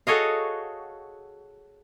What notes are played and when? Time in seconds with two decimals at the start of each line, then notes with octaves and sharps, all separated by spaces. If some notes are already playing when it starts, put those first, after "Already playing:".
0.07 F#4 G#4 A4 C#5 D#5 F5